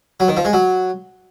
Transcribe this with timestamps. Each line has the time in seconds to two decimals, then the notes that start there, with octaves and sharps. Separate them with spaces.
0.20 F#3
0.28 D#3
0.37 F3
0.45 G#3
0.53 F#3